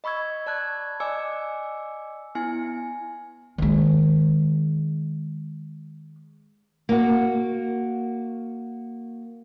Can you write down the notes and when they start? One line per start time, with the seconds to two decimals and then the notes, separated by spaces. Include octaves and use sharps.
0.04 D#5 B5 C#6 E6 G#6
0.46 D5 A5 F#6 G#6
1.00 D5 D#5 G#5 D6 E6 C#7
2.35 B3 E4 G#5 C#7
3.58 D#3 G#3
6.89 A#3 F#4